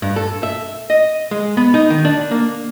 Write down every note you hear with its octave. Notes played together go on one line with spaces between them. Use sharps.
G2
A4
E5
D#5
G#3
B3
D#4
D#3
D4
A#3